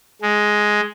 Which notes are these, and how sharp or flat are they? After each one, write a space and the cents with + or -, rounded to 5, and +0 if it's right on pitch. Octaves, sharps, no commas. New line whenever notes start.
G#3 +5